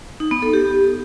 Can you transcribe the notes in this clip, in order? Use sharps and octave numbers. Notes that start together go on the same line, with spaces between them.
D#4
B3
A4
G4